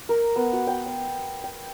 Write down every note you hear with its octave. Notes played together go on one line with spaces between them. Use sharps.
A#4
B3
F#4
G5
C6
G5